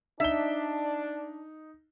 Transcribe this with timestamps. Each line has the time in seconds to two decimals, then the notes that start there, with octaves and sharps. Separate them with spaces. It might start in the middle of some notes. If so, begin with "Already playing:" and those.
0.20 D4 D#4 E5 G7